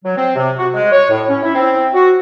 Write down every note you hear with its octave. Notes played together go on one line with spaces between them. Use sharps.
F#3
C4
C3
F#4
G#3
C#5
A2
C#4
E4
C4
F#4